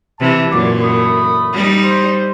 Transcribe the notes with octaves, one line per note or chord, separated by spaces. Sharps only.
C3 E3 A5
F#2 A#2 D5 D6
A3 B5 D#6
G3 D#4
C5